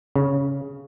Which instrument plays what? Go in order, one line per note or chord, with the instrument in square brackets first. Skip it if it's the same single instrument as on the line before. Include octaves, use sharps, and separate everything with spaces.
[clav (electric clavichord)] C#3